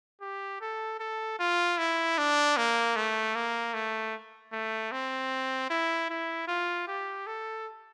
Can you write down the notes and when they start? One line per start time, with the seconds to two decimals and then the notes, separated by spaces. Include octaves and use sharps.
0.21 G4
0.61 A4
1.00 A4
1.39 F4
1.78 E4
2.18 D4
2.57 A#3
2.96 A3
3.35 A#3
3.74 A3
4.52 A3
4.92 C4
5.70 E4
6.10 E4
6.48 F4
6.88 G4
7.26 A4